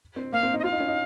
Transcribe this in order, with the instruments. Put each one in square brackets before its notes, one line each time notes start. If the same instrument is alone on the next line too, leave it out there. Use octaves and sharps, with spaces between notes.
[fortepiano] C4
[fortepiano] A#3 [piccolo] F5
[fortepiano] C4
D#4
[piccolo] D#5
[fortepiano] F4 [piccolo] F5
[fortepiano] D#4
C#4
D#4